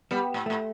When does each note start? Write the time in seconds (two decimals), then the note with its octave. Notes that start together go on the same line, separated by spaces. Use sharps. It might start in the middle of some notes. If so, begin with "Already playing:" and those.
0.11 G3 B3
0.34 A2
0.46 A2 A3